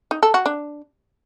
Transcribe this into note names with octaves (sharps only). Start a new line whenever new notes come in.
D#4
A4
F#4
D4